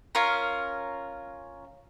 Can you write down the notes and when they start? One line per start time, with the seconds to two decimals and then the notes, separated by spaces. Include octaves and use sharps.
0.15 C#4 F4 A#4